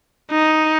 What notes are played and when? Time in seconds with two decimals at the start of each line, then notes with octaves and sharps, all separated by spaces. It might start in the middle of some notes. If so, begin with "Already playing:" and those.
0.31 D#4